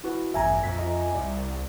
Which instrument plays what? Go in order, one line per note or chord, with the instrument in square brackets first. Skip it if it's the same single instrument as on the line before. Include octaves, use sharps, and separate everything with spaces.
[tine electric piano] E4 F#4 B4
[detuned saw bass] A1 [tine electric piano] E2 G2 [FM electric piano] E5 G#5 A#5
[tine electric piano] A#1 B6 [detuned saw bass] F2
[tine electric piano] F4 D#5
[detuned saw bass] C2 [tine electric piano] D5